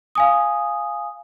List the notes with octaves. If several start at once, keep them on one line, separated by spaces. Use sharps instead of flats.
F5 G#5 D#6